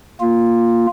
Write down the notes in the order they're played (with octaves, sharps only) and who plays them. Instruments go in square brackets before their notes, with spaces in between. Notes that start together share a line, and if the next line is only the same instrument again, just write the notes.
[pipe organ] A#3 F4